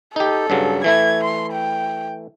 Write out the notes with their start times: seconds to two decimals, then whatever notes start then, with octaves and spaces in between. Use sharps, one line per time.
0.16 D#4 G4 A4
0.50 G2 C#3 F#3
0.84 E3 A3 E4 G#6
1.24 C6
1.53 G5